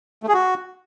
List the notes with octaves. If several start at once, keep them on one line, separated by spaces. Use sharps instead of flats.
A3
G#4
F#4